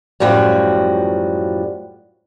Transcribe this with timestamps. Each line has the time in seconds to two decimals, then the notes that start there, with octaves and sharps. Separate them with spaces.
0.20 F#2 A2 F3 G3 F#4